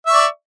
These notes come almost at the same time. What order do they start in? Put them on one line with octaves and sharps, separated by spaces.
E5 C#6 D5